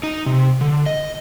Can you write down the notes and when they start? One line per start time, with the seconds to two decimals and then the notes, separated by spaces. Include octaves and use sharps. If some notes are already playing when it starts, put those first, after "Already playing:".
0.03 D#4
0.26 C3
0.61 D3
0.86 D#5